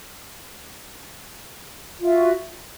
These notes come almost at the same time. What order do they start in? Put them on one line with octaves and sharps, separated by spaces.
F4 E5 F#4